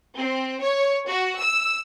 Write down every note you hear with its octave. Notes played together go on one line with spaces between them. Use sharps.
C4
C#5
F#4
E6